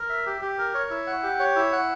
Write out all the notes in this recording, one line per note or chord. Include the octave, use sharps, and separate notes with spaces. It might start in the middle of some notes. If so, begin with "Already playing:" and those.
Already playing: A#4
E5
G4
G4
A#4
C#5
E4
F#5
G4
C#5
E4
F#5